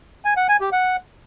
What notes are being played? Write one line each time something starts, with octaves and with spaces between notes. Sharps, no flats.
G#5
F#5
G#5
G4
F#5